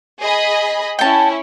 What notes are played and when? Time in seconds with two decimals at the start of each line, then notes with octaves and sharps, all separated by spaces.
0.20 G#4 D#5 B5
0.99 C#4 E4 G5 A5